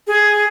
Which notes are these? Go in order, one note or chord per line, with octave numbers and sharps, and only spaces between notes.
G#4